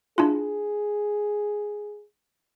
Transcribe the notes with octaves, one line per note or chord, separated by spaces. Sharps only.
D4 E4 F4 G#4